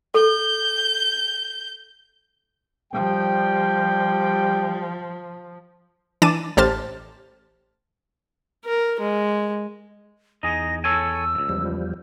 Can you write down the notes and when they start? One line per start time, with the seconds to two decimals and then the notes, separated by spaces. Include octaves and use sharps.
0.14 A4 G6
2.94 F3 G3 G5
6.22 E3 D4 D6 A6 D#7 E7
6.57 A1 G4 C5 A5 F6 A6
8.65 A#4
9.00 G#3
10.43 E2 D#4 G#4 A#6
10.84 A4 C#5 G#5 E6
11.35 C#2 G#2
11.49 E2 F3 G3